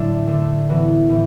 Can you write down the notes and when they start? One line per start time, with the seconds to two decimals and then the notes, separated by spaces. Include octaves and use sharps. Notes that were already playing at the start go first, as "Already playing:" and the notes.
Already playing: A2 D3 F#3 A3 D4
0.27 D3 A3 D4
0.68 A2 E3 B3 F#4
1.09 A2 E3